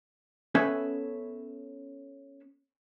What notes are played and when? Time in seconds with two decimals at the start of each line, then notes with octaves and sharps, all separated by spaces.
0.55 B3 C#4 A4 B4 E5 G#5